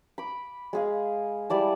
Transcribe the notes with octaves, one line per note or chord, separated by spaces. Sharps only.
B5 D6
G#3 G#4 F5
G3 E4 D5 A5